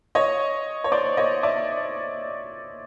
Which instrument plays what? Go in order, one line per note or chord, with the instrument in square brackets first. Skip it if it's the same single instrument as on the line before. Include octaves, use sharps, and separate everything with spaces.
[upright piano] C#5 D#5
C#5
C5 D5
C#5 D#5
D5 E5